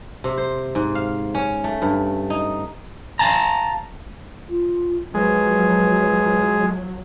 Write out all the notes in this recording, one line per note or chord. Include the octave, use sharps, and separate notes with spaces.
C3
C5
G#2
F5
C#4
A3
G2
D#4
F5 A5 A#5
F4
F3 F#3 G#3 B4